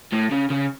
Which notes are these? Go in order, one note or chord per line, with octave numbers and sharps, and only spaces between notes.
A2
C#3
C#3